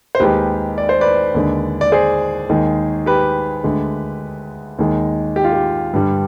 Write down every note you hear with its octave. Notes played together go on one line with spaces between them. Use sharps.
C5
D#2 D#3 G#3 G4 B4
D5
C5
B4 D5
D#2 D3 G#3
D5
G#4 C5
D#2 D#3 G#3
G4 B4
D2 D3 G#3
D#2 D#3 G#3
G4
F4
G4
G2 D3 G3